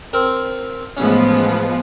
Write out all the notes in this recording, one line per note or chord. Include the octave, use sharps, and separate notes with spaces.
C4 A#4
A1 F3 G#3 B3 C#4